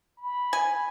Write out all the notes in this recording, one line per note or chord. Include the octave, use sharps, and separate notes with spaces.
B5
G#5